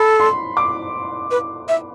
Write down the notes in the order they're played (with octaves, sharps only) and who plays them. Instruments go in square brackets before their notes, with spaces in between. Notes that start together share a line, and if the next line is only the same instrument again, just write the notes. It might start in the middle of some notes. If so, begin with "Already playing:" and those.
Already playing: [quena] A4 [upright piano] B5
[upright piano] C6
D6
[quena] B4
E5